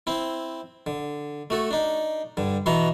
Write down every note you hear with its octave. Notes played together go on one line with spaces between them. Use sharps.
C4 E4
D3
A3 F#4 A4
D4 D#4
G2 D3
B2 E3 B3 F#4 E5 A#5